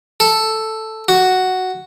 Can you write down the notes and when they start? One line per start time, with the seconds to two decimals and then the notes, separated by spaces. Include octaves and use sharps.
0.20 A4
1.08 F#4